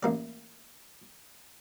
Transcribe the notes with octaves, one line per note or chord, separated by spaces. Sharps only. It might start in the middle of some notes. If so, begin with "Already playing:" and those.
A1 A#3 D5